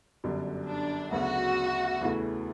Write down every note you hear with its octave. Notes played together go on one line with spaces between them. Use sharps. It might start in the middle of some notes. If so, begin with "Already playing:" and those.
G1 F#2 D3 G3
D4
D2 C#3 F#3 B3 F#4
E2 C#3 E3 A3